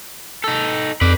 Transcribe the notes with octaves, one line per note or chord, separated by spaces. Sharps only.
D#4 A4
F2 B4 D5